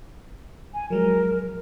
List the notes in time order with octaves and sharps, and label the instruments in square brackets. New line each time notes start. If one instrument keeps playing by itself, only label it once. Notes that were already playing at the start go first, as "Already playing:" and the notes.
[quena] G#5
[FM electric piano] F3 F#3 G#3 [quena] A#4